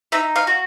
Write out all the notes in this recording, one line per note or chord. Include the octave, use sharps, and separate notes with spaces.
D#4 E5
F5
F#4